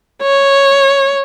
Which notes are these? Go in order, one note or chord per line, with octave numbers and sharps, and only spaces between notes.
C#5